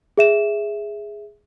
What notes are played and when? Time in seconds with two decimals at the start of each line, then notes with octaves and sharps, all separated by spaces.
0.18 G#4 E5 E7